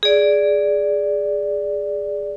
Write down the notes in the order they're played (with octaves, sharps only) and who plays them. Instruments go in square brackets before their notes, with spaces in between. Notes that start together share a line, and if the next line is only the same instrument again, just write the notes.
[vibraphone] G#4 D5